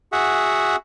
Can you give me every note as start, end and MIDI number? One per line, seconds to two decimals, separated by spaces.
0.12 0.76 66
0.12 0.76 68
0.12 0.76 76
0.12 0.76 78